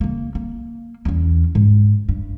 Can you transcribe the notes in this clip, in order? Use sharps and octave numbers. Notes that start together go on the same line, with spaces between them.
C#3 A#3
A#3
E2 C#4
G#2
G2